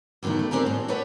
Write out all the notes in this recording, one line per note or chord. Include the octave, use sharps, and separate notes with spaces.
E2 D3 D#3 A3 E4
A3
C4 D4 G4 G#4 A#4
A2
G4 A4 B4 C#5 D5 F#5